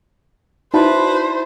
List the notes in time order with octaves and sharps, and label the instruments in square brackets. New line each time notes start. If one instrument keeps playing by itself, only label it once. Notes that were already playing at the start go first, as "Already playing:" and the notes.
[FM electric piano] D#4 F#4 D5 [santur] E4 A5 [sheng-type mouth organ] B4 [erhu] C5